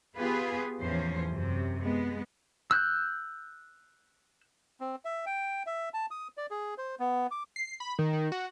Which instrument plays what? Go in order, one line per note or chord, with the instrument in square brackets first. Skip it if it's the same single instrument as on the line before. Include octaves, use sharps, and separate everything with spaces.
[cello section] B3 F4 G4 G#4 B4
E2 A2 F3 C#4 C5
F#2 C3
G#3 B3
[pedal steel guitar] E6 F#6 G6
[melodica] C4
E5
G5
E5
A5
D#6
D5
G#4
C5
B3
D6
[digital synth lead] C7
B5
D#3
D#3
F#4